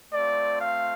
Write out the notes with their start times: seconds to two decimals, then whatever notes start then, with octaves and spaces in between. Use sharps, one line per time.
0.12 A3 C4 F4 D5
0.61 F5